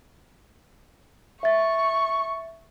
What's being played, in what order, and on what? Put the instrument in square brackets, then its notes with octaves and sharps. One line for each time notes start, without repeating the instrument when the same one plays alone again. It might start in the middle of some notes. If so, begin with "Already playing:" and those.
[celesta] E5 A6 [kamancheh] C#6